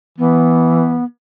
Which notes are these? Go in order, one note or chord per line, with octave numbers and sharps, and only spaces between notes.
E3 B3